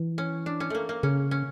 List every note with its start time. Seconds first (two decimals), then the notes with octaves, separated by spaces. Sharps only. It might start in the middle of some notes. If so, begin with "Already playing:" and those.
Already playing: E3
0.18 C#4
0.46 D4
0.60 C#4
0.70 A3 A#3
0.89 A#3
1.03 C#3 C#4
1.31 C#4